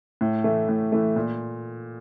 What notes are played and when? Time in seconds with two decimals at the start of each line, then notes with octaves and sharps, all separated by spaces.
0.21 A2
0.44 E3 A3
0.69 A2
0.92 E3 A3
1.16 A#2